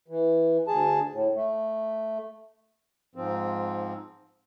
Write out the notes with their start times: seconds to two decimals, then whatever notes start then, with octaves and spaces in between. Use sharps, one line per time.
0.08 E3
0.68 D2 G#4 A5
1.12 A2
1.35 A3
3.15 G#2 F3 C4